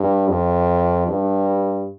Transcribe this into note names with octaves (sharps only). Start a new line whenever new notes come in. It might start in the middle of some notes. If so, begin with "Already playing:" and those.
Already playing: G2
F2
G2